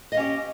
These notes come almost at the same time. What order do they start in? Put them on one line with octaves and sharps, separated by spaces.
D#5 F5 C#4 G4